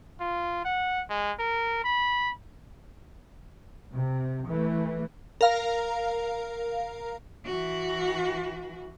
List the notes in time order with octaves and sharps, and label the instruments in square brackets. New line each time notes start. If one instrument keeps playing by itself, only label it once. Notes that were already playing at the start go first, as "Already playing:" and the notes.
[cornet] F4
F#5
G#3
A#4
B5
[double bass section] C3
E3 A3
[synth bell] A#4 F5 A#5
[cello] E3 F#4